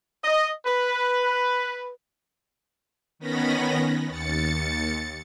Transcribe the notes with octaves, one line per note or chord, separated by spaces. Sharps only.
D#5
B4
D#3 B3 C#4 B5 A#6
D#2 A6 C#7